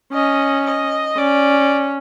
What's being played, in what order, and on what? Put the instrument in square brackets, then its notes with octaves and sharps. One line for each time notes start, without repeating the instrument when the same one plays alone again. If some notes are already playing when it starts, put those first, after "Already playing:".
[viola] C#4 [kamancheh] D#5
[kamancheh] D#5
[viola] C#4 [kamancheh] D5